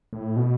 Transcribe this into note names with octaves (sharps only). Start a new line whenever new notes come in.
A2
B2